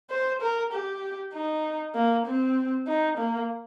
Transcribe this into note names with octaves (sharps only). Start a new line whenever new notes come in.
C5
A#4
G4
D#4
A#3
C4
D#4
A#3